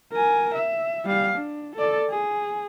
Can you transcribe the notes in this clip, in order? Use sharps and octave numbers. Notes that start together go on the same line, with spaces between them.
A#4 G#5
E5
G3 F5
D4
A4 D5
G#4